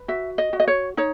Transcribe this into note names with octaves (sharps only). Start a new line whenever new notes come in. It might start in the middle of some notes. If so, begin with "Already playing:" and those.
Already playing: B4
F#4 E5
D#5
F#4
D#5
C#5
D#4 C#5